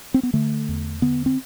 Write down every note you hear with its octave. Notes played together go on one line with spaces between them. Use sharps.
C4
B3
D3 A3
E2
D3 B3
C4